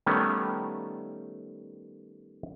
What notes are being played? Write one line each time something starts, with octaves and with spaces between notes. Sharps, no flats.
D#3 G3 A3 B3 C#4